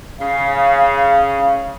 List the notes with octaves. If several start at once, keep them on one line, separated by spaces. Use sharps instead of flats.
C#3 F5